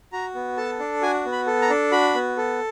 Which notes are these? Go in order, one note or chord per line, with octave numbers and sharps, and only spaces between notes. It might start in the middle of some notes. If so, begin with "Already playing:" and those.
F#4 A#5
B3
A4 A5
D4
F#4 G#5
B3
B5
A4
A#5
D4
F#4 B5
B3
A4